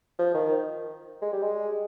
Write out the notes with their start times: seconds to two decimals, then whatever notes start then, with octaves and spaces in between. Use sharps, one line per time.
0.19 F3
0.34 D#3
1.22 G#3
1.33 G3
1.42 G#3